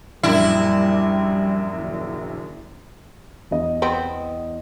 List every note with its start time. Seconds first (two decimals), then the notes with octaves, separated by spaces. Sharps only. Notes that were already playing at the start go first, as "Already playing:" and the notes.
0.23 A#1 F#2 G3 E4
1.73 F#1 D#2
3.51 E2 D#5
3.82 B3 C4